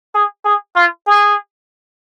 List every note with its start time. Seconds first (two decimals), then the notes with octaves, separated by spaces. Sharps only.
0.15 G#4
0.45 G#4
0.76 F4
1.07 G#4